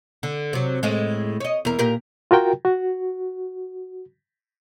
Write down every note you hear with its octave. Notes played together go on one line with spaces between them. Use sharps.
D3
C3 F#3
A2 G#3
C#5 D#5
E2 A#4
A#2 G4 A#4
F4 F#4 A#4 G5
F#4